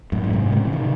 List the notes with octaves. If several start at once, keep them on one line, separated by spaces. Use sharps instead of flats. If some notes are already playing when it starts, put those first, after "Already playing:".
F#2 A2
A2
G#2 C3
A2 C#3
E3
C3 D#3